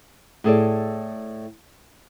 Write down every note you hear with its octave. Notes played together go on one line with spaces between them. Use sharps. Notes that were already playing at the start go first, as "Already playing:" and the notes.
A2 G#4 A4 D5